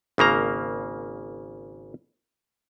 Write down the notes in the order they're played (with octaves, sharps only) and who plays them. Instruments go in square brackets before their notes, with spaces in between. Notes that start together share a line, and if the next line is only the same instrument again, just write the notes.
[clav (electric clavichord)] G#1 C#3 A#3 A#5